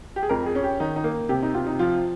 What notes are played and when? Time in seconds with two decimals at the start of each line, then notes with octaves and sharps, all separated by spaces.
0.16 G4
0.23 G#4
0.29 F2 A#4
0.46 G#4
0.55 C#4
0.63 G4
0.80 D#3 D#4
0.96 D#4
1.04 A#3
1.29 C3 G4
1.42 D#4
1.54 C3 F4
1.67 D#4
1.79 F3 F4